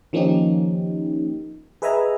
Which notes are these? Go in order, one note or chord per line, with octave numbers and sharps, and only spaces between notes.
D#3 F3 A#3 C#4 D#4 G4
G#4 B4 D#5 E5 G#5 A#5